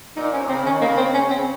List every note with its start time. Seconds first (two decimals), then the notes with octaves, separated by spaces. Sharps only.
0.16 A#2 D#4
0.32 C3 C#4
0.48 C#3 C4
0.65 D#3 C#4
0.81 C#3 A#3
0.97 C4
1.14 C#4
1.30 C4